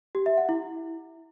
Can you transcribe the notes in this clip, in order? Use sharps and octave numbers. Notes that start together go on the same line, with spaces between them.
G4
E5
F#5
E4